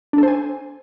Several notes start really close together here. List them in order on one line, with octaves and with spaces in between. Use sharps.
D4 A4 C5 G#5